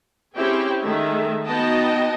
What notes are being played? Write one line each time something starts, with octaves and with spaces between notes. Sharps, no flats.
C4 C#4 E4 G4 G#4 G5
D#3 G#3 A3 E5
B3 D#4 F#4 D#5 G5 A5